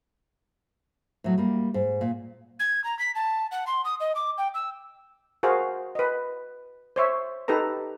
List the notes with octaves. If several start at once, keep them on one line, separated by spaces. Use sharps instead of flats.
A2 F#3
G3 A#3
G#2
A#2
G#6
A#5
B6
A5
F#5
C6
D#6
D#5
D6
G5
E6
F#4 G#4 A#4 C5 F5
B4 D#5
C5 C#5 E5
D#4 G4 A4 B4 A#5